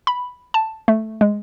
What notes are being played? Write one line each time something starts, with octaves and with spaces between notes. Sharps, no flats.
B5
A5
A3
G#3